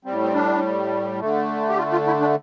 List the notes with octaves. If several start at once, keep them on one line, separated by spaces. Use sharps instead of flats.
A2 G3 C4
C4
D4
D3 A3
G4
F4
F4
E4
D4